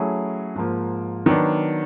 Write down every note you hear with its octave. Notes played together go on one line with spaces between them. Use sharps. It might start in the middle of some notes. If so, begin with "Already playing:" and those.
Already playing: F#3 A3 C#4 E4 G#4
G#2 F3 A#3
D#3 F#3 B3 D4